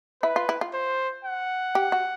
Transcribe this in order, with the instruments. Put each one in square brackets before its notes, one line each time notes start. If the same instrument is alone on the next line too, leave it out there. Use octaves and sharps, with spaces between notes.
[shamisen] E4 [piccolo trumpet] B4
[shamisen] F4
E4
F4
[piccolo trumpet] C5
F#5
[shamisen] G4
F#4